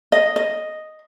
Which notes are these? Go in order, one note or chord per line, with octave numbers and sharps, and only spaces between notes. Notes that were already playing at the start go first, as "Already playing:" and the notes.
D#5
D#5